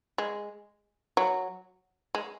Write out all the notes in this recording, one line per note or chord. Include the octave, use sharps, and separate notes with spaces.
G#3
F#3
G#3